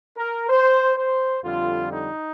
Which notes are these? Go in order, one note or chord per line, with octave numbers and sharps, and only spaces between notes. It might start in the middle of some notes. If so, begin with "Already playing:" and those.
A#4
C5
C5
F2 D3 G3 F4
D#4